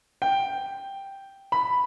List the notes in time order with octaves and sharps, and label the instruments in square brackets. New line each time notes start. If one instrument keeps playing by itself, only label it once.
[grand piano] G5
B5